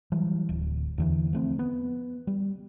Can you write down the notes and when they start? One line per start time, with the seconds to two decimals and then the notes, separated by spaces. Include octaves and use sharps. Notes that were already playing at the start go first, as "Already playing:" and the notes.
0.12 E3 F#3 G3
0.49 D1
0.98 E2 D3 E3
1.33 F3 A3 C4
1.59 B3
2.27 G3